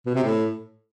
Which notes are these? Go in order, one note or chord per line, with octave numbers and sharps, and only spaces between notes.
B2
C3
A2